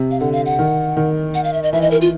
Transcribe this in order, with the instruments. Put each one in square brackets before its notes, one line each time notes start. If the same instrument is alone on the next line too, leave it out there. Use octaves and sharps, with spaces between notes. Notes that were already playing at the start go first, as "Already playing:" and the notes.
Already playing: [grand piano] C3
[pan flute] F5
[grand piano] D3 [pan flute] F#5
[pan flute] F5
F#5
[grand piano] D#3
D#3
[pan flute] F#5
F5
E5
D#5
[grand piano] E3 [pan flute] E5
[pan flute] D#5
A#4
F4